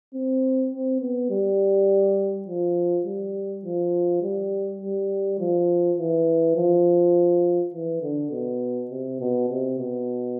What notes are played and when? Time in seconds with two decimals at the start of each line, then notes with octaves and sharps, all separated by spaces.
0.14 C4
0.72 C4
1.01 B3
1.30 G3
2.48 F3
3.06 G3
3.65 F3
4.22 G3
4.82 G3
5.39 F3
5.98 E3
6.56 F3
7.74 E3
8.02 D3
8.31 B2
8.91 C3
9.20 B2
9.49 C3
9.79 B2